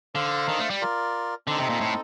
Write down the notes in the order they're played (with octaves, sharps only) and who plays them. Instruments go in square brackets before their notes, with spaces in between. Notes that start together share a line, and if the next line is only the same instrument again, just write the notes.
[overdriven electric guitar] D3 [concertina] D4 A4 C5 F5
[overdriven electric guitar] D#3
A3
G3
[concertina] F4 A#4 D5
[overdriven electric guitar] D3 [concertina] C4 D#4 A4
[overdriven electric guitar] C3
A#2
A2